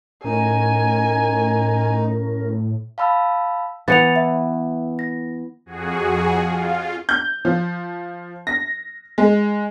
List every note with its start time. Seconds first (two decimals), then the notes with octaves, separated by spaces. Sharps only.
0.24 A2 C#4 D#4 A#4 G#5
2.98 F5 A5 B5 E6
3.88 E3 B3 E4 A6 C#7 F7
4.16 E5
4.99 A#6
5.66 F2 F#4 G#4
6.40 F4
7.09 G6
7.45 F3
8.47 A#6
9.18 G#3